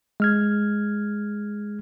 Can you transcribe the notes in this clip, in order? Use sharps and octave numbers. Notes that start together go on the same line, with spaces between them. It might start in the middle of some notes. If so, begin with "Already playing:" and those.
G#3 F6 G#6